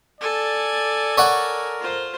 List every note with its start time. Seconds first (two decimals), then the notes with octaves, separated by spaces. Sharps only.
0.21 A4 D5 G#5
1.18 A#4 C#5 D5 F#5
1.80 F4 C5